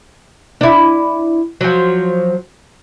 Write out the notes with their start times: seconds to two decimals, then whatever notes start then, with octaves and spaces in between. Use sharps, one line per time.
0.61 D4 E4
1.61 F3 F#3